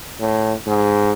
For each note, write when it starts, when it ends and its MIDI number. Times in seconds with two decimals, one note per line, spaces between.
0.20 0.53 45
0.66 1.12 44